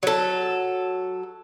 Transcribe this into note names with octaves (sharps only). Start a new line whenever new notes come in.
F#3 A4